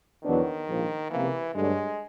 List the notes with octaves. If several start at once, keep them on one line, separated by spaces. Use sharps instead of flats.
E2 B2 D#3 F#3 B3 D4
A#1 G#2 F3
C#2 C3 E3 F3 A#3
G2 D3 F#3 G#3 A3 D4